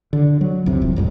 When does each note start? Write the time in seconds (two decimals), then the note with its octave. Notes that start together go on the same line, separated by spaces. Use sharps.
0.13 D3
0.41 F#3
0.66 C2 F2 C3
0.82 D#1
0.96 D1 F2 G#2